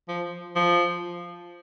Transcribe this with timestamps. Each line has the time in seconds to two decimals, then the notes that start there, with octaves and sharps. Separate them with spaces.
0.09 F3
0.56 F3